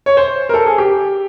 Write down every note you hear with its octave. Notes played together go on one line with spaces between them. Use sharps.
C#5
C5
A#4
A4
G#4
G4